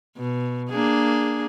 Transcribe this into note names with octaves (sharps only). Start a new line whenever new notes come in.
B2
A#3 D4 G#4